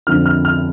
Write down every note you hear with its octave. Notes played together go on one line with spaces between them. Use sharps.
F2 D3 F3 F6
F6
F6